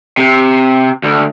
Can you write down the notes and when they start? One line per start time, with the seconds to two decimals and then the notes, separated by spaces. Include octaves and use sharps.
0.17 C3
1.03 D2